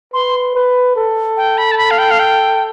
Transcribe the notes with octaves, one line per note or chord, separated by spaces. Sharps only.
B4 C6
B4
A4
G5
B5
A5
B5
F5
G5
F5
G5